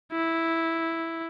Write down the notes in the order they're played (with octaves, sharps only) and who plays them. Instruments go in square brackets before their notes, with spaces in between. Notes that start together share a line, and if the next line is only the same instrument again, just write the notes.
[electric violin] E4